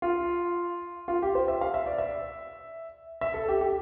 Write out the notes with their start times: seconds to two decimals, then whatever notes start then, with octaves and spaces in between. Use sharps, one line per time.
0.02 F4
1.08 F4
1.22 G4
1.35 C5
1.48 E5
1.61 F5
1.74 E5
1.86 D5
1.98 E5
3.21 E5
3.34 A4
3.48 G4
3.61 G4